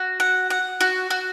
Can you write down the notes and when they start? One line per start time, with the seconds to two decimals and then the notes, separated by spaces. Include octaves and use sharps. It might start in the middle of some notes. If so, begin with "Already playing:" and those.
Already playing: F#4
0.20 F#5
0.50 F#5
0.81 F#4
1.10 F#4